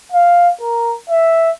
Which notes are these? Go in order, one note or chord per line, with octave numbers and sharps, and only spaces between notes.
F5
A#4
E5